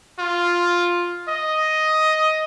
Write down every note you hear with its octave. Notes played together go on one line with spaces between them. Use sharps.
F4
D#5